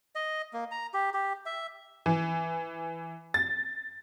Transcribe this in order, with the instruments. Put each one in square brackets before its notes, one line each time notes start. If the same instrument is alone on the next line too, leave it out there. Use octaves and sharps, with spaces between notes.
[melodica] D#5
A#3
A#5
G4
G4
E5
[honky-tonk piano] E3
A6